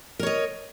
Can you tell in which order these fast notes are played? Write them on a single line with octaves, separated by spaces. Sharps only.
A#4 C#5 D#5